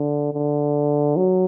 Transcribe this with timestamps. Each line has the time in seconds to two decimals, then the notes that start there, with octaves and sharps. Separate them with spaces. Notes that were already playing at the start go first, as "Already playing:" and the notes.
Already playing: D3
0.33 D3
1.16 F#3